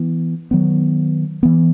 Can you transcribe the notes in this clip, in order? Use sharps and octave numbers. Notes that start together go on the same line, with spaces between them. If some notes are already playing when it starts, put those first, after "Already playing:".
Already playing: E3 B3
D#3 F#3 B3
E3 B3